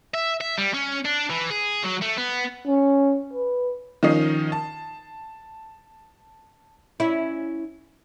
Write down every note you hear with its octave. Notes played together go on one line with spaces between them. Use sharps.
E5
E5
G3
C#4
D4
E3
G#4
F#3
A3
B3
C#4
B4
D#3 F3 C#4 D#4 D#6 C7
A5
C#4 E4